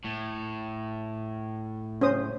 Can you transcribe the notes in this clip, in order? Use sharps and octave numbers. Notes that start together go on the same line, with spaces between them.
A2
C#4 C5 D#6